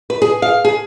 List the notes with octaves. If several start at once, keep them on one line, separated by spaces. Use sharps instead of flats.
B4
G#4
F5
G#4